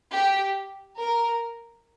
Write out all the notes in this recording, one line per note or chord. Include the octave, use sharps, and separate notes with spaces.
G4
A#4